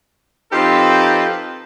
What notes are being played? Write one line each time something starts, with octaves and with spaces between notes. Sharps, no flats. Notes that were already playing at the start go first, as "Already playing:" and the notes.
F3 C4 D#4 G4 A4 B4